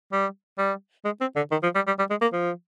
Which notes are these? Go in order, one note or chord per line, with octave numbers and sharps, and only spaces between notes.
G3
G3
G#3
C4
D3
D#3
F3
G3
G3
G3
G#3
A#3
F3